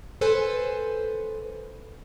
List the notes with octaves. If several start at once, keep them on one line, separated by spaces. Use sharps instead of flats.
A4 B4 C5 G#5